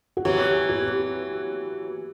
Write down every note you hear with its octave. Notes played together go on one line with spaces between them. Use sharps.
F#4
E3 F#3 G4
G4